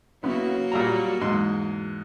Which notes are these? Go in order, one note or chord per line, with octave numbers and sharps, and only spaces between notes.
C#3 F#3 A#3 B3 E4 F#4
A#2 G3 A#5
E2 G#2 C6